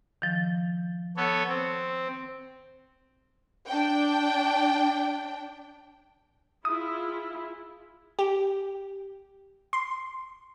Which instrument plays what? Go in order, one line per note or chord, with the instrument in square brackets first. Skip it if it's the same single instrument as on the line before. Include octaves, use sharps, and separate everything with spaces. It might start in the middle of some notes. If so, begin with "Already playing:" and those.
[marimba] D#3 F3
[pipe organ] B3 A4 C#5
C4
[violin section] D4 G5
[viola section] E4 F4 G#4 [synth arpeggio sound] D#6
[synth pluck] G4
C6